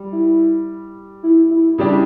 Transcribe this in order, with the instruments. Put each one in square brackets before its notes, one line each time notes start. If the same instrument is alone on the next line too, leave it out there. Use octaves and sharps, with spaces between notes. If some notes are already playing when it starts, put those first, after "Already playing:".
Already playing: [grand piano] G3
[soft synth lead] E4
E4
E4
[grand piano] C#3 G3 D4 G4 [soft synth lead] E4